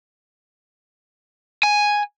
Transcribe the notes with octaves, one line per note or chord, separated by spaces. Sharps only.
G#5